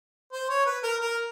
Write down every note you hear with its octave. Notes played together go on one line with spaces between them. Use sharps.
C5
C#5
B4
A#4
A#4